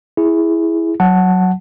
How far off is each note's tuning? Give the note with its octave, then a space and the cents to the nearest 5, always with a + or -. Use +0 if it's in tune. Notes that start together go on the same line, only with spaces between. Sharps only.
E4 +0 G#4 +0
F#3 +0 F#5 +0 A5 +0